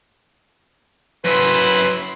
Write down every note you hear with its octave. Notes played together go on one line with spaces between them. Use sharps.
F#2 F#3 E4 B4 C6